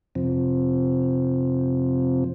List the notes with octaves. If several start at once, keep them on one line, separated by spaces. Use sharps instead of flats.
F2 C3 F3 C4